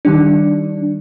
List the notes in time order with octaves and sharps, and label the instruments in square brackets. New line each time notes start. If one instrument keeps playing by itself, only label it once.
[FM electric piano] D#3 G3 D4